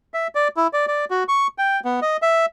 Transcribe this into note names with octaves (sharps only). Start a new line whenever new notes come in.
E5
D5
E4
D5
D5
F#4
C#6
G5
B3
D#5
E5